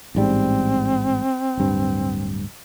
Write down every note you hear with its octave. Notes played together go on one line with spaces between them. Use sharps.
A1 G#2 G3 C4
D1 G2